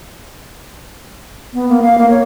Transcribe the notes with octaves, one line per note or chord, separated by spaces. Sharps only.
B3
A#3
F5
A#3
C#5